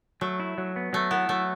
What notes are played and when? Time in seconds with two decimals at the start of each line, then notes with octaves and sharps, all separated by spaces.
0.21 F#3 A3
0.40 E4
0.58 F#3
0.76 B3
0.93 F#3 A3
1.11 B3 E4
1.29 F#3 A3